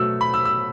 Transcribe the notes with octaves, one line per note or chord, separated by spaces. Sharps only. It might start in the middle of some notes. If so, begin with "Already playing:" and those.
Already playing: B2 F#3 A3 E6
B5
E6
E6